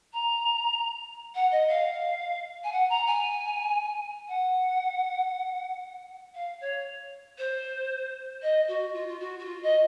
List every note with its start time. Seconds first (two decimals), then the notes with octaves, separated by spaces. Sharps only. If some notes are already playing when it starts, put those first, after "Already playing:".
0.13 A#5
1.35 F#5
1.51 D#5
1.69 F5
2.64 G#5
2.72 F#5
2.90 A#5
3.07 G#5
4.28 F#5
6.35 F5
6.61 C#5
7.38 C5
8.42 D#5
8.68 F#4
8.94 F4
9.08 F4
9.20 F#4
9.39 F#4
9.45 F4
9.63 D#5